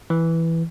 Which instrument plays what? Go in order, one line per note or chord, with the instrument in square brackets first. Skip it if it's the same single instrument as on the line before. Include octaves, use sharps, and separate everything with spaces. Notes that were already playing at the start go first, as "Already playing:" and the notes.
[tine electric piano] E3